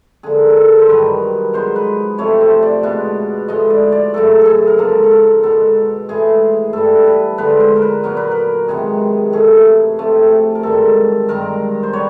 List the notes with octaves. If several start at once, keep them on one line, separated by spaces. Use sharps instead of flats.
D3 F3 A#3 G#4
G#4
A4
C5
G2 D#3 F#3 B3 B4
G#2 F3 G#3 B3 C5
B4
C3 F3 A3 C#5
C5
D5
B2 G#3 B3
A2 F3 G#3 D#5
D5
D5
F#2 C#3 F#3 A3 A4
G#4 A4
A#4
G#2 F3 A#3 A4
A4
A#4
B2 G#3 B3 A4
A2 E3 G#3 G#4
G2 E3 G3 A4
B4
D3 F3 G#3 B3 B4
C5
A#4
B4
A#2 F#3 B3 A#4
B4
A#4
C3 D#3 G#3 B3 G#4
A2 E3 A3 G#4
C3 F3 A3
A#4
G2 D#3 G#3 A4
G2 D#3 G#3 A#4
C5
G3 B3 C#5